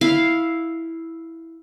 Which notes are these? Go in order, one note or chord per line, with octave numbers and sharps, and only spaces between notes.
E4 F5